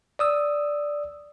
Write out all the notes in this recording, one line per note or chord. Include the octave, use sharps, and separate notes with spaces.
D5 D#6 E6